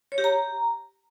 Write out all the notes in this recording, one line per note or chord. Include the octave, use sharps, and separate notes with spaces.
C#5
G4
A#5